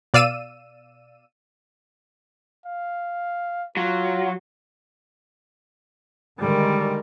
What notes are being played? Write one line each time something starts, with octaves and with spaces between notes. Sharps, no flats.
B2 D5 F5 E6 D#7 E7
F5
F#3 F4
D3 D#3 G3 G#3 A#4